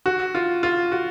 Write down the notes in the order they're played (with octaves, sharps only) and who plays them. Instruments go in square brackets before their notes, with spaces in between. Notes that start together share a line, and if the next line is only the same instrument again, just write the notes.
[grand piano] F#4
F4
F4
F#4